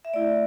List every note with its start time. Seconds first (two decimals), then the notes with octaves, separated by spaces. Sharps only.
0.05 E5
0.13 A3 E4 D5